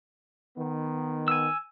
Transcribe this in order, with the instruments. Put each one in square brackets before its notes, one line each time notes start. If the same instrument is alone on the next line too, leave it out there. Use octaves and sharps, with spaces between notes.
[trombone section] D#3 B3
[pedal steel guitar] G#5 E6